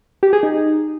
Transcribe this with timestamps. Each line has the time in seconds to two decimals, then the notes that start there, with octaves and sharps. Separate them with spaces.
0.23 G4
0.33 G#4
0.43 D#4